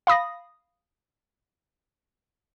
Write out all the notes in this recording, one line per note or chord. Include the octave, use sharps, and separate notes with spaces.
F5 B5 D#6 A#6